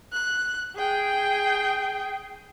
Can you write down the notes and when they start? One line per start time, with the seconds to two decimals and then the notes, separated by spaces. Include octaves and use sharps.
0.13 F#6
0.76 G#4 G5